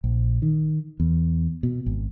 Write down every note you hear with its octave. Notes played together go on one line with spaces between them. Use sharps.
A#1
D#3
E2
B2
G#1